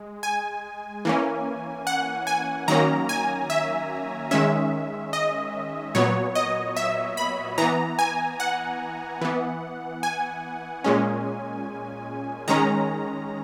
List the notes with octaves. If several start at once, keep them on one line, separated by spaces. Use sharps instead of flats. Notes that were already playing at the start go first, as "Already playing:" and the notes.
Already playing: G#3
G#5
E3 A#3 C#4
F#5
G#5
D#3 F#3 A#3 C#4 A#5
G#5
E5
D#3 G#3 C#4 E5
D#5
A#2 F#3 B3 C#5
D#5
E5
B5
E3 B3 A#5
G#5
F#5
E3 B3
G#5
A#2 G#3 C#4
D#3 G#3 C#4 A#5